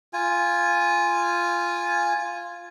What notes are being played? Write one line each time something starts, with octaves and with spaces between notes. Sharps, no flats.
F4 G#5